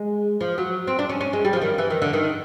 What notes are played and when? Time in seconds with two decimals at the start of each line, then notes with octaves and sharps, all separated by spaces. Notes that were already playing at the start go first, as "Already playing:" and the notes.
Already playing: G#3
0.41 F3
0.58 F#3
0.87 C4
0.99 D4
1.09 C#4
1.21 C#4
1.33 G#3
1.45 G3
1.53 F3
1.61 D#3
1.78 E3
1.90 D#3
2.02 D3
2.13 D#3